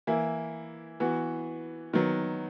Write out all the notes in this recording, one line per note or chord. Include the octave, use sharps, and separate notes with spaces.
E3 A#3 E4
E3 B3 F#4
D#3 F#3 B3